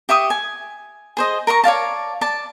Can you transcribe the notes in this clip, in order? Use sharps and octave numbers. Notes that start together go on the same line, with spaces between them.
G4 E5 C#6 D#6
G#5
G#4 C5 D#5
A#4 A#5 B5 C#6
C#5 D5 F5 A5
D5 A5